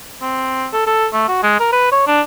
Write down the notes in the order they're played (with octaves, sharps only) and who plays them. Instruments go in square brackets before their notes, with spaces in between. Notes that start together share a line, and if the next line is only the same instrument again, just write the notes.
[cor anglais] C4
A4
A4
A3
F#4
G#3
A#4
B4
C#5
D4